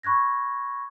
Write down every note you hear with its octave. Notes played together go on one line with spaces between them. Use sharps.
B5 C#6 F#6 G#6 A#6